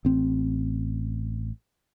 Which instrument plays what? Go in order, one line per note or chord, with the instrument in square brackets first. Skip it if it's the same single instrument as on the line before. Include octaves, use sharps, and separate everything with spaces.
[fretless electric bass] A1 C4